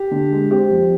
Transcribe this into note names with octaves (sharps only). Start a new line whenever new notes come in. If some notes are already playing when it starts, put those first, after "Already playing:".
Already playing: G4
D3
G#3
C4 G4
F2